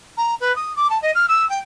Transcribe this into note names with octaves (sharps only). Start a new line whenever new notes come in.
A#5
B4
D#6
D6
A5
D#5
F6
E6
G5